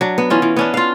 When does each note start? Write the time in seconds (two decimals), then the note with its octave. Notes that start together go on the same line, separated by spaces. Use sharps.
0.01 F#3 D4
0.18 B3
0.30 E3 C#4 F4
0.42 E3
0.56 B3 C#4 D4
0.74 F4 F5